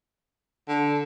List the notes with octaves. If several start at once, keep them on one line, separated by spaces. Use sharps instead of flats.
D3